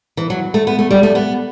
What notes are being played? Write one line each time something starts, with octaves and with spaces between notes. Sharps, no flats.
E3
F#3
A3
B3
A3
G3
A3
B3